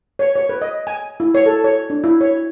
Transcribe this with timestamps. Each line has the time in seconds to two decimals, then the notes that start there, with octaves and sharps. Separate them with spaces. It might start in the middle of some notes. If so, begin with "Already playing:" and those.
0.19 C#5
0.36 C#5
0.49 B4
0.62 D#5
0.87 G#5
1.20 E4
1.35 C#5
1.46 A4
1.64 C#5
1.90 D4
2.04 E4
2.21 C#5